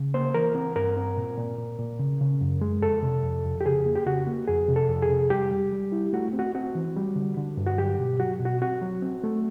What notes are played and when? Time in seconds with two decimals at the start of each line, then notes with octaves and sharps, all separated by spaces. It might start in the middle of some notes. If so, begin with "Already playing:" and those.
Already playing: C#3
0.14 A#3 C5
0.34 E3 A#4
0.55 C4
0.76 G2 A#4
0.97 C4
1.17 A#2
1.38 A#2
1.58 A#2
1.79 A#2
1.99 C#3
2.21 C#3
2.41 F#2
2.61 G#3
2.82 F2 A4
3.03 C3
3.23 F2
3.45 F2
3.61 G4
3.65 C#3 G#4
3.86 A#3
3.96 G4
4.06 C#3 F#4
4.27 A#3
4.47 F2 G#4
4.68 C3
4.76 A4
4.89 F2
5.02 G#4
5.09 C3
5.30 G3 G4
5.51 G3
5.72 G3
5.92 E4
6.13 A3 F#4
6.33 C4
6.39 F#4
6.55 C4 F#4
6.75 E3
6.96 G3
7.16 D3
7.37 D3
7.57 G2
7.67 F#4
7.78 F#3 G4
7.99 B2
8.20 F#3 F#4
8.40 B2
8.45 F#4
8.62 C4 F#4
8.82 F#3
9.02 C4
9.24 A3